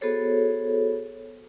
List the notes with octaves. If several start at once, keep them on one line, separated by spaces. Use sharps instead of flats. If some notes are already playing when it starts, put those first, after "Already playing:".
B3 F#4 G#4 A4 C5 C#5